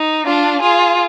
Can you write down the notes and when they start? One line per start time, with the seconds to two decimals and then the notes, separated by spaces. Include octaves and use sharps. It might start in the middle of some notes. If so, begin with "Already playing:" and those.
Already playing: D#4
0.25 D4 F4
0.62 F4 G#4